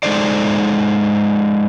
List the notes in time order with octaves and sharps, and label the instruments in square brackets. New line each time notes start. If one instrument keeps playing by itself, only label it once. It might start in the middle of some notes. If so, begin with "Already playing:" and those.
[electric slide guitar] G#3 D#4 A4 C5 D5